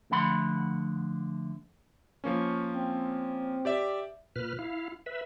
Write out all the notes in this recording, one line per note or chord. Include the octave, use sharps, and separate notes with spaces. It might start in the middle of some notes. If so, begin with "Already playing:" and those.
D3 F3 A3 F#5 B5 C6
F3 A#3 C#4 C#6
C4
G4 D5 E5
A#2 B4 F6
E4 F5
B4 E5